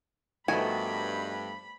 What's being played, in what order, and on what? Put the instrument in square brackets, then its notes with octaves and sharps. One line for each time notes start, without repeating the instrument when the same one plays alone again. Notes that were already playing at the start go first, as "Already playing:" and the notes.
[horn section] G2 [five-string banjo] D#3 F#4 G#5 [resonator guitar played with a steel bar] F3 A3 B3 [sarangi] B5